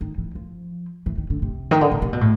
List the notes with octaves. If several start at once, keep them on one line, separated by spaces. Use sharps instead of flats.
D#3
E3
F3
E3
D#3
D3
C3
D#3
D3
C#3
C3
B2
A2